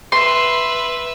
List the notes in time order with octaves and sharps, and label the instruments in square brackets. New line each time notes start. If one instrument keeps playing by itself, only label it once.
[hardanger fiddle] B4 E5 [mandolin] C6